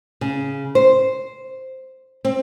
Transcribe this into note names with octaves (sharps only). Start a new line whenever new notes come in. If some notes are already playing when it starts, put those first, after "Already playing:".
C#3
C5
C4